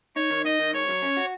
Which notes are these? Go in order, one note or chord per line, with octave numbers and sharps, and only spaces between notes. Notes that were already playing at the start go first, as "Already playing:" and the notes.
D#4 C#5
D#3
D#4 D#5
D#3
G#2 C#5
F#3
C#4
F#4